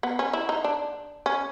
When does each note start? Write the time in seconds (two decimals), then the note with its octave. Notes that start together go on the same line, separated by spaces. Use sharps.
0.03 B3
0.19 C#4
0.33 E4
0.49 D#4
0.64 D4
1.26 C#4